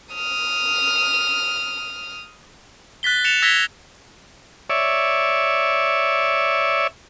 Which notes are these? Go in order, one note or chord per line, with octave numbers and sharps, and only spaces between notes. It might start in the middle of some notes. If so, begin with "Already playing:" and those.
D#6 F6
F#6 A6 B6 G7
A6 C#7 E7 F7
E6 G#6 A#6 B6 F7 G7
C#5 D5 E5